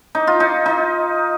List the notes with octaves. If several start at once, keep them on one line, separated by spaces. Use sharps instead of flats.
D#4
F4
D#4
D#4